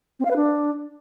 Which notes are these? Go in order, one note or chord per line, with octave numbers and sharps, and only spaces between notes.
C4
F5
B4
D4